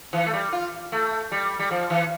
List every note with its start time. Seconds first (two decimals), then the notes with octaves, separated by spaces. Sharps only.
0.13 E3
0.26 A3
0.33 G3
0.53 F4
0.92 A3
1.32 G3
1.59 G3
1.71 F3
1.90 E3